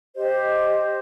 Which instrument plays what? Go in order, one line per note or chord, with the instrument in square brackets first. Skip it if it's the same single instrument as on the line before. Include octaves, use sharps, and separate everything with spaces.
[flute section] G4 C5 D#5